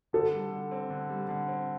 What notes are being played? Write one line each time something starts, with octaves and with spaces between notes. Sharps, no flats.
D3 A4
G3
D3
C4
D3
G3
D3
C4